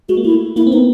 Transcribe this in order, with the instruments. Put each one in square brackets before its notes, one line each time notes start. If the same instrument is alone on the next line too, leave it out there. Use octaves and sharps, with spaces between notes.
[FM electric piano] G#3 [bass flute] F#4
[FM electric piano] A#3
[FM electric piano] A3 [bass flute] E4
[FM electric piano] A#3 [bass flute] E4
[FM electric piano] C4
[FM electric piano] B3 [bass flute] D#4